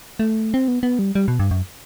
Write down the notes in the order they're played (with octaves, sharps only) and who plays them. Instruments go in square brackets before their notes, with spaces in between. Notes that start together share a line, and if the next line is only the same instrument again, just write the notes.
[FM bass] A3
C4
B3
B3
G3
G3
B2
G2
F#2